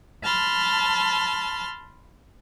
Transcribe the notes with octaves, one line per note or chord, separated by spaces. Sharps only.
A5 B5 C6 F6